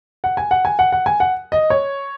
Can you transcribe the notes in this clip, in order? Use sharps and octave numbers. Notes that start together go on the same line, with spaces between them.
F#5
G#5
F#5
G#5
F#5
F#5
G#5
F#5
D#5
C#5